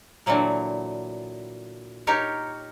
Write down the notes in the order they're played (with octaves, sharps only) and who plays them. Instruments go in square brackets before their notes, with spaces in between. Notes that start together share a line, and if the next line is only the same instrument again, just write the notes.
[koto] A#2 D3 E3 F#3 A#3
D#4 G4 A#4 C#5